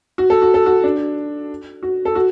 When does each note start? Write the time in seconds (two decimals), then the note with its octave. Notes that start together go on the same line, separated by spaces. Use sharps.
0.18 F#4
0.30 A4
0.42 F#4
0.54 A4
0.66 F#4
0.84 D4
1.83 F#4
2.05 A4
2.15 F#4